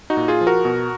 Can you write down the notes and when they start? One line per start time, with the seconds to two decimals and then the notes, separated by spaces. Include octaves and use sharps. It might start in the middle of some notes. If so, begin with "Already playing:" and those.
0.10 D#4 F#4
0.17 A#2
0.28 F4 G#4
0.41 F3
0.47 F#4 A#4
0.65 B2